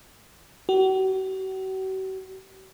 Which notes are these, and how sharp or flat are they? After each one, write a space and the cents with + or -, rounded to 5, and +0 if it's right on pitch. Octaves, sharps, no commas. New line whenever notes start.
F#4 +45